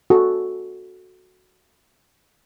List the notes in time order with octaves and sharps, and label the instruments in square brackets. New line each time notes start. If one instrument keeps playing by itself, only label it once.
[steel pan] F#4 A4